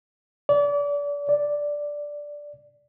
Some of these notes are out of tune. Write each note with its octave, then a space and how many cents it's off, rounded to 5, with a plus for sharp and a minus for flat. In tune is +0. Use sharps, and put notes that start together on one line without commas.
D5 -35
D5 -5